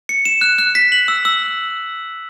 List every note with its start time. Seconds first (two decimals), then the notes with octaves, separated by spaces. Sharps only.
0.09 C#7
0.25 E7
0.41 F#6
0.58 F#6
0.75 B6
0.92 F#7
1.08 E6
1.25 E6